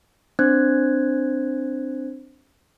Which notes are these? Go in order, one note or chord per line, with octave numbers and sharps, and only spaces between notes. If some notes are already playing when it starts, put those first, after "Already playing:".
C4 D4 C5 F#6 G#6